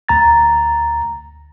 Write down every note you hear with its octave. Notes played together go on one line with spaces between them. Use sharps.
D2 A#5 A6